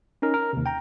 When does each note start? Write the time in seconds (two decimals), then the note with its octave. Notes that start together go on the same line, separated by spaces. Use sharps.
0.22 C#4 D#4 A#4
0.34 A#4
0.53 D#2 C3
0.66 G5 A#5